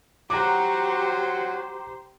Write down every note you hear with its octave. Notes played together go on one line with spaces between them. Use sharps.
F#3 F#4 G4 C5 A#5 D6